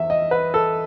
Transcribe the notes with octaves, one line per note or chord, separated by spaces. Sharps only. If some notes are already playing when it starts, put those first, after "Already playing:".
Already playing: E2 E5
D#5
B4
A4